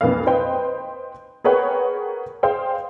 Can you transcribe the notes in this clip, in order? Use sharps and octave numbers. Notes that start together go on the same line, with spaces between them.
B1 F2 A#3 B4 F5
B4 C5 D#5 G5
G#4 A#4 B4 C#5 F#5 G5
G#4 C5 F5 G5